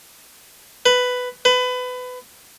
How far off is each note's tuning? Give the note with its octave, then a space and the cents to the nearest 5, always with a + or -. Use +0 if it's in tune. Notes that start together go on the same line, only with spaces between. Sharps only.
B4 +10
B4 +25